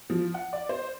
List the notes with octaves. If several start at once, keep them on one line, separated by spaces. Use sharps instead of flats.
F3
F#5
D5
C5